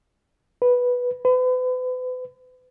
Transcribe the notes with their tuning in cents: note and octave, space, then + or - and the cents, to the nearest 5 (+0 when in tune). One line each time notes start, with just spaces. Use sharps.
B4 -5
B4 +40